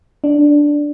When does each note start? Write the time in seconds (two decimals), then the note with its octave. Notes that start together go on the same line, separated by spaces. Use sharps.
0.24 D4